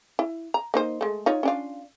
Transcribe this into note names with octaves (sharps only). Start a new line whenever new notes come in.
E4
A#5
A#3 D#4 C5
G#3 A3
D#4 F4 C#5
C#4 D4 F4